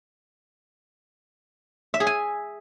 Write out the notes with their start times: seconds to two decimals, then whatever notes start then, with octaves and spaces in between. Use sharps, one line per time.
1.94 E5
2.00 G#4
2.07 G#5